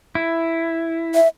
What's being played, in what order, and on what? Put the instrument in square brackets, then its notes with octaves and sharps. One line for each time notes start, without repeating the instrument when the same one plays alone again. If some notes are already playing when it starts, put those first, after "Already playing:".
[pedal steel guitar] E4
[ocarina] E5